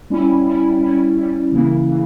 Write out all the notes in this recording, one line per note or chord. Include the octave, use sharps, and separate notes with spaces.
G3 C#4 E4
G3 C#4 E4
G3 C#4 E4
G3 C#4 E4
C#3 E3 A#3 E4
C#3 E3 A#3